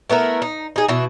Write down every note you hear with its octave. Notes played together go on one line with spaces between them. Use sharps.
A3 B3 E4 A#4
D#4
D#4 G#4
B2 E3 E4